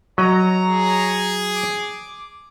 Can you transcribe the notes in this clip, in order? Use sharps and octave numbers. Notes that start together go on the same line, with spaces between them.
F#3 C#5 D#5 A#5
G#4
D6